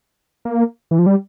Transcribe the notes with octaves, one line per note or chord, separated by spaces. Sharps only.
A#3
E3
F3
G3